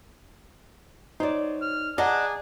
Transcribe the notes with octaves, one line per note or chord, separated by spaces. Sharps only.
F#3 D#4 C5 D5
F6
D4 G#4 D5 D#5 F#5 A5 A#5